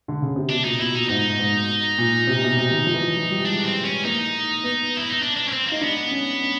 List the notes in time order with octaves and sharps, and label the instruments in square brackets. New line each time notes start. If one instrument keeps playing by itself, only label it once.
[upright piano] D3
C#3
C3
[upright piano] B2 [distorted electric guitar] D4
[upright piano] A#2 [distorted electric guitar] D#4
[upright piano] B2 [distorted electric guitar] E4
[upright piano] A#2 [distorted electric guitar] D#4
[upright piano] G#2 [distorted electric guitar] D#4
[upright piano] G#2
A#2
C3
B2
C3
D#3
F3
E3
F3
F3
G3
[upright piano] G#3 [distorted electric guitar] D4
[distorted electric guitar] C4
C#4
[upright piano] A#3 [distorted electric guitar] D#4
[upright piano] B3
[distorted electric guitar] E4
D#4
D4
D4
C#4
C4
A#3
[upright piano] D#4
[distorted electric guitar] B3 [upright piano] D4
[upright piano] C#4
C#4